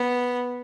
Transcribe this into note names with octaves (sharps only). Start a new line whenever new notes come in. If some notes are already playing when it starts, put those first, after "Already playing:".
Already playing: B3